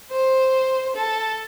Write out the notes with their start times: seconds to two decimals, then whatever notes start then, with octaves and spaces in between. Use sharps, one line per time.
0.11 C5
0.95 A4